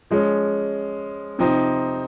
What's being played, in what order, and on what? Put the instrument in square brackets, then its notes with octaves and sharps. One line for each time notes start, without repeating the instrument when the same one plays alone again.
[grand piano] F3 G#3 C#4
C3 F3 C4 D#4